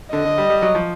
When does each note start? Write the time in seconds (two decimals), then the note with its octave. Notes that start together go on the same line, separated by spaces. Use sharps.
0.13 D3 D#5
0.25 D3
0.38 G3
0.50 G3
0.62 F#3
0.75 F3